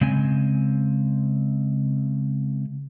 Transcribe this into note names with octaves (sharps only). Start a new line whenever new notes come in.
C#3 G#3 C4 G#5